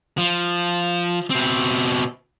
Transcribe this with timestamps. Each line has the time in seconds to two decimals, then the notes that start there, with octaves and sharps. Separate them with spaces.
0.18 F3
1.30 B2 C4